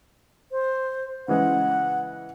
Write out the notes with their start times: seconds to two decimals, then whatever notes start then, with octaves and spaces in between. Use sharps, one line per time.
0.51 C5
1.28 C#3 E3 G#3 F#5